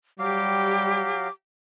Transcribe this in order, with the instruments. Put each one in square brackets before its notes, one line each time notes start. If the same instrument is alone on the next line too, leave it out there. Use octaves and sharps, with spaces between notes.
[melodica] F#3 F5 [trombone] G3 [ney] G4 [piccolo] D6